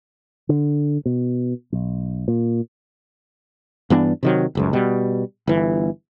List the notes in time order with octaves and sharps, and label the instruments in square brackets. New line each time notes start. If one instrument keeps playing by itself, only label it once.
[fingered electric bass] D3
B2
B1
A#2
[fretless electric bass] G2 E3 B3 D4
C3 D#3 F#3
F#1 C#2 F#2
B2 G3
G1 E3